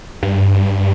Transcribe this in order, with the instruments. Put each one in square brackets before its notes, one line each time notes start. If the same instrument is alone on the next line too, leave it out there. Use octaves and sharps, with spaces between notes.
[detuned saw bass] G2